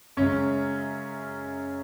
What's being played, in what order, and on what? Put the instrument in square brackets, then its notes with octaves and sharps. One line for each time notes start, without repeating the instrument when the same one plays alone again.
[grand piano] F#2 C#3 G#3 C#4